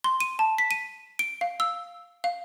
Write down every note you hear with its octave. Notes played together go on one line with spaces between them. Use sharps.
C6
D#7
A5
B6
D#7
D7
F5
E6
F5